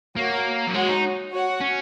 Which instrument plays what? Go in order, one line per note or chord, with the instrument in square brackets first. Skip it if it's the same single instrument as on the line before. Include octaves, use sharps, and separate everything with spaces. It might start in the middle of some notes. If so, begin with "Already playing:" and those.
[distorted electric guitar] A#3 [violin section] F#4 C#5 F#5
[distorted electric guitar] F#3
[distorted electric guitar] G#3 [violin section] F#4 C#5 F#5
[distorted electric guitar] D#4
[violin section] F#4 C#5 F#5
[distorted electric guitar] C#4